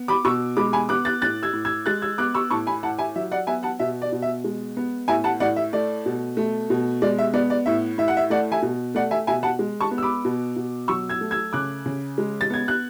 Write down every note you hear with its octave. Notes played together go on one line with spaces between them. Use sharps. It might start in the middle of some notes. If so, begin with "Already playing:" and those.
Already playing: B3
B5 D6
B2 C#6 E6
G#3 B5 D6
G#5 B5
B3 D6 F#6
F#6 A6
A2 F#6 A6
E6 G#6
A2
E6 G#6
G#3 F#6 A6
E6 G#6
B3 D6 F#6
C#6 E6
A2 A5 C#6
G#5 B5
A2 F#5 A5
E5 G#5
F#3 E5
D5 F#5
B3 E5 G#5
F#5 A5
B2 E5
D5
B2
E5
G#3
B3
A2 E5 G#5
F#5 A5
A2 D5 F#5
E5
A3 D5
B2
A3
B2
G#3 D5
E5
B3 D5
D5
A2 E5
A2 E5
F#5
E5
A3 D5 F#5
E5 G#5
B2
A3 D5 F#5
E5 G#5
B2 E5 G#5
F#5 A5
G#3
A5 C#6
B3
E6
B5 D6
B2
B2
F#3 C#6 E6
E6 G#6
A3
E6 G#6
C#3 D6 F#6
C#3
G#3
A6
B3 G#6
F#6